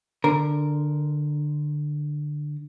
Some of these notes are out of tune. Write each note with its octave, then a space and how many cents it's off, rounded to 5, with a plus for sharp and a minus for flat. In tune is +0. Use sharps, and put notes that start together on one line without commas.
D3 +15 A#4 +0